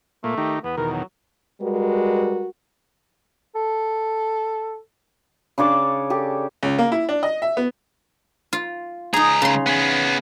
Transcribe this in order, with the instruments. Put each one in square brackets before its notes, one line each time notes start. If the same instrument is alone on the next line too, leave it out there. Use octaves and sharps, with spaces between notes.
[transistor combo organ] A#2 A#3 [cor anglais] A3
[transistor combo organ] D#3 D#4 G4
[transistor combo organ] E2 [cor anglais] B3
[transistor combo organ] E2 B2 D#3 [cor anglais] A#4
[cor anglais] F#3
[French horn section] G3 G#3 F#4 A#4 B4
[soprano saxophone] A4
[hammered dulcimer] C#3 D4 C#5 D6
G4 A4
[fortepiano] C#2
A#3
E4
D4
D#5
E5
B3
[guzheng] F4
[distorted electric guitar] C#2 A#5 [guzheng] D#4 G#4
[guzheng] C#3 C6
[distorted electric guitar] B3 G#4